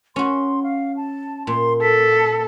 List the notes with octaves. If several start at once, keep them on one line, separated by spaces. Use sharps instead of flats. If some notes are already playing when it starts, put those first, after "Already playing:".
C#4 F#4 C6
F5
A5
A#2 C6
A4 B6